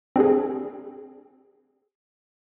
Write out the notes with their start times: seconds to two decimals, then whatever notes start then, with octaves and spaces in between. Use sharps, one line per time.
0.16 C4 D4 G4 G#4